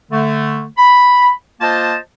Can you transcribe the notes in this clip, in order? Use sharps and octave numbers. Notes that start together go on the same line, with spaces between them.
D3 A3
B5
A#3 F4 C5 D#5 A5